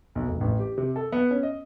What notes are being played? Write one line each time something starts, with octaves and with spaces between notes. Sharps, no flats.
B1
F1
A1
G4
C3
A4
B3
C#4
D#5